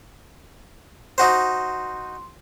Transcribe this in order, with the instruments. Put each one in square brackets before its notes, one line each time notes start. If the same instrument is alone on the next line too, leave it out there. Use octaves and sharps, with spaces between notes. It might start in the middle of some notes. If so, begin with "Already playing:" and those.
[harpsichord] D#4 F#4 C5 [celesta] C6